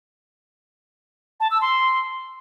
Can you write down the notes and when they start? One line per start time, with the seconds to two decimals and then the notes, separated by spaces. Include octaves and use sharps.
1.40 A5
1.51 E6
1.61 C6